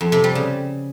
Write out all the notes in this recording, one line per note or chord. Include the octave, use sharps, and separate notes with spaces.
F2
C3
G3
C#3